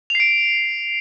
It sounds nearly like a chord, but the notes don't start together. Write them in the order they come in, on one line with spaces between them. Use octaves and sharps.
F7 C7 D7